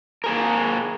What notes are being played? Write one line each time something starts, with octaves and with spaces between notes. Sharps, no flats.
A#3 G#4 A#4